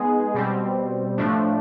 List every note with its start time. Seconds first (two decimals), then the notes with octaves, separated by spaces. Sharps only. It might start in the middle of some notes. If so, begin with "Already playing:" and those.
Already playing: G#3 B3 D#4 G#4
0.34 B2 G3 C4
1.18 A2 F3 A3 D4